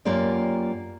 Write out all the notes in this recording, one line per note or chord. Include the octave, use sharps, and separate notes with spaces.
F#2 A#3 F4 G4 D5